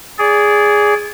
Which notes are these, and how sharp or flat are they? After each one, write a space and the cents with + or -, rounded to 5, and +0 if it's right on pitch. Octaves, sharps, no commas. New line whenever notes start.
G#4 +0 D5 -25